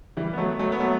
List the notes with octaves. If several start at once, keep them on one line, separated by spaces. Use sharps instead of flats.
E3 G3
B3
F#3 A3
F#3 A3
B3
F#3 A3